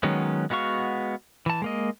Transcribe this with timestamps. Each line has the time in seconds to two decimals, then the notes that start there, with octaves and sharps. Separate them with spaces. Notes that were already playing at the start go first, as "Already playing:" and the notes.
0.03 D#3 F#3 G#3 B3 C#4
0.50 G#3 B3 F#4 F5 C#6
1.46 E3 A5
1.62 G#3 A#3 D#5